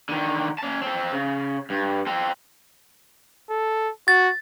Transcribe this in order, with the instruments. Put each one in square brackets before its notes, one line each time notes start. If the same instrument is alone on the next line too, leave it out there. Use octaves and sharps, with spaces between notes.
[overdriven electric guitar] D3 D#3
C#4 A5
C4 A4
C#3
G2
C4 A4
[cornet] A4
[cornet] F#4 [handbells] A6